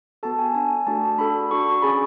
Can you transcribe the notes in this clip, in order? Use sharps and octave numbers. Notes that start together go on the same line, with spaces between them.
B3 F#4 A4 A5
G#5
D4 A4 G#5
A3 D4 F#4 A4 A5
D4 F#4 A4 B5
D4 F#4 A4 C#6
C#4 G#4 B5